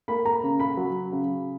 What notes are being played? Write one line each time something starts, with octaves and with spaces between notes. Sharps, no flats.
A#3 B5
A#5
C#3
B5
F#3
C#3